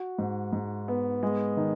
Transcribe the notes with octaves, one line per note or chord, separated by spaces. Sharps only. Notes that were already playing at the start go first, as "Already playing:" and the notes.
Already playing: F#4
G#2
G#2
B3
G#3
D#3